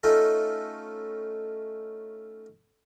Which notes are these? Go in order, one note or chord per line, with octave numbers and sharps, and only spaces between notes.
A3 C#4 D#4 F4 A4